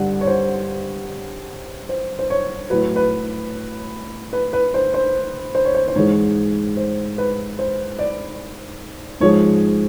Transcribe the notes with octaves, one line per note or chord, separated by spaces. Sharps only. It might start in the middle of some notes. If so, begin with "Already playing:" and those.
Already playing: G2 D3 G3 F#5
C#5
C5
C5
C5
C#5
A2 F#3 B4
B4
B4
B4
C5
C5
C5
C#5
C5
C5
G#2 E3 G#3 C#5
C5
B4
C5
D5
G#2 F3 G#3 C#5